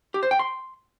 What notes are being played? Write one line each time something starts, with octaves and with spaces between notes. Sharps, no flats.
G4
C5
G5
C6